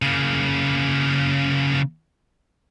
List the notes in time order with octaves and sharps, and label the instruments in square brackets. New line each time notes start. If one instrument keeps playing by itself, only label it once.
[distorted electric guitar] C#3 A#3